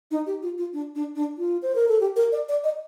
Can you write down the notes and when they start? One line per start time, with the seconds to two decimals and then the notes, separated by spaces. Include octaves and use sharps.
0.11 D#4
0.27 G4
0.42 F4
0.58 F4
0.73 D4
0.95 D4
1.16 D4
1.38 F4
1.62 C5
1.75 A#4
1.88 A4
2.00 G4
2.16 A#4
2.32 D5
2.49 D5
2.64 D#5